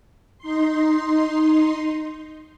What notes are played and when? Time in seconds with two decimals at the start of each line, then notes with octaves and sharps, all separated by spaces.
0.38 D#4 C6